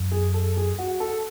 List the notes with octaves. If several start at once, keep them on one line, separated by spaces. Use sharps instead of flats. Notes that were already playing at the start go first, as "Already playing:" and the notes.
Already playing: F#2
G#4
A4
G#4
F#4
A4